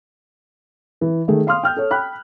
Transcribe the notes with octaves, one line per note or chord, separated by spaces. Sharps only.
E3
D#3 A3 G#4
F5 C6 D#6 F6
G5 F6 G6
A4 C#5
G5 B5 F#6